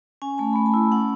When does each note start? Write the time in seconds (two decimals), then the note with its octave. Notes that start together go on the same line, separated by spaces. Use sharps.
0.22 C#4 G#5
0.38 A3 A5
0.53 A3 B5
0.66 A5
0.74 E4
0.92 C#4 F#5